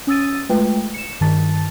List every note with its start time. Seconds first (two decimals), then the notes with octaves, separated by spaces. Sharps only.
0.07 C#4 D#6 E6 A6 D#7
0.49 G#3 A3 F4 B4 G5
0.94 C#7 E7
1.21 G2 D#3 A5 A6